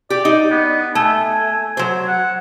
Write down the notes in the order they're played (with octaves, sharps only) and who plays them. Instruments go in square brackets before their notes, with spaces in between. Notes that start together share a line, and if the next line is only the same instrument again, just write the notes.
[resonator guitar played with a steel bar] G4 [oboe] D5
[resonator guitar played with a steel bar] D#4
[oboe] B3
[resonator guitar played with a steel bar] A3 [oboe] G#5
[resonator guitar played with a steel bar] F#3 C5
[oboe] F#5